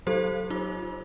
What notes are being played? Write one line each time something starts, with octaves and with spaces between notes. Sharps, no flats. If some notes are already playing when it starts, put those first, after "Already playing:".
F#3 G4 A4 C5
D#4 F4